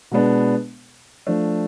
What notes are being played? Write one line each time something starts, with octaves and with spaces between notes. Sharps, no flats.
B2 G#3 B3 D4
F3 A3 D4